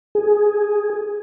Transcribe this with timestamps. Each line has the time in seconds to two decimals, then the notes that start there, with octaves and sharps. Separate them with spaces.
0.15 G#4